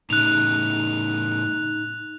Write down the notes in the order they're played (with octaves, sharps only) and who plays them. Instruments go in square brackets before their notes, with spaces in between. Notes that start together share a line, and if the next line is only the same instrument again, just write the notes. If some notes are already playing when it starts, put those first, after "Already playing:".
[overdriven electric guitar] A2 C#3 [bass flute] D#4 [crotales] F#6 F7